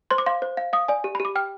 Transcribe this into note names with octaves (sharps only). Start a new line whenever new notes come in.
C5 C6
D6
F5 C6
C5
F5
F5 D#6
D5 G#5
G4
B5
G4
D6
G5 F6